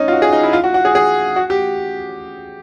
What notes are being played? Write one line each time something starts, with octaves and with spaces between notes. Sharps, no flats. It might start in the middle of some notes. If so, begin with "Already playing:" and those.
Already playing: C#4 D#4
F4
F#4
G#4
D#4
E4
F4
F#4
F#4
G#4
G#4
F#4
G4